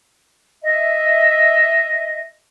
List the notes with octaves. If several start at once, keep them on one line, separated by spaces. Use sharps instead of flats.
D#5 E5